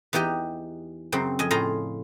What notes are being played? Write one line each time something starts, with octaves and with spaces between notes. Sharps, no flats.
E2 E3 D#4 G4 D#5
F#2 C#3 C4
F2 D#5 G#5
A2 F4 G#4 D#5 A#5